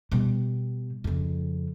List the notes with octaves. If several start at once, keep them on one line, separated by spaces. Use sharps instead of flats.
B2 G3
F2 C#3